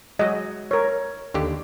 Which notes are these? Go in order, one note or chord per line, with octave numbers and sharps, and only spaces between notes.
F#3 G#3 D#5
A#4 C#5
D#2 D3 G4